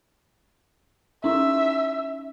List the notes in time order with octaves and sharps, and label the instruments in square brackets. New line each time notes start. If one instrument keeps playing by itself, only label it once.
[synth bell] C#4 D#4 E4 [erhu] E5